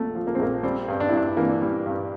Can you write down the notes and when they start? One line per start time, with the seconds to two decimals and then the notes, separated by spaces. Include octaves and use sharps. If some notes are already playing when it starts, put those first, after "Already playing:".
Already playing: A#1 A#2 A3
0.15 F3
0.27 A#3
0.35 C4
0.39 A#1 A#3
0.63 G3 C4
0.88 G2
1.00 D4
1.09 E4
1.13 G2 D4
1.37 E3 A#3
1.62 G3
1.86 G2